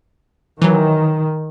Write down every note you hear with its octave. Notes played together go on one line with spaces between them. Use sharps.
D#3 E3 F#3